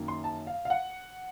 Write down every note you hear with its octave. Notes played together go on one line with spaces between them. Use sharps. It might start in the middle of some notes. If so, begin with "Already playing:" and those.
Already playing: F#2 D#3 A#3
C6
A5
F5
F5
F#5